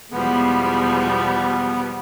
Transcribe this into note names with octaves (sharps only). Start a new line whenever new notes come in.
E2 B2 F3 G3 G#3 B3